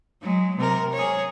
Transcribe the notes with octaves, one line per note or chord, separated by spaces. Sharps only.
F#3 G#3
C3 A#4
G#4 C#5